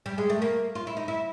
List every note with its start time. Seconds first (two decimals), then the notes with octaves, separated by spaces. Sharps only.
0.06 G3
0.18 G#3
0.30 A3
0.42 A#3
0.75 F4
0.87 E4
0.97 D#4
1.08 E4